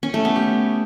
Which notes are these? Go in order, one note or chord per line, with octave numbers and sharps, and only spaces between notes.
C#4
A3
B3
G4